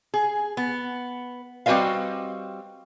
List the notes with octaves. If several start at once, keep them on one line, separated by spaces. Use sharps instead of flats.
G#4
B3
G3 C4 F#4 B4 D#5 F5